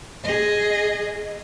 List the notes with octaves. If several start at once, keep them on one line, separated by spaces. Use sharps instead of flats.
G#4 D#5